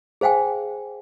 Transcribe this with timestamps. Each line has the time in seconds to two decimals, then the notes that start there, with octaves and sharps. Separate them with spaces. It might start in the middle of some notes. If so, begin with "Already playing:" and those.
0.21 G#4 C5 F5 G5 G#5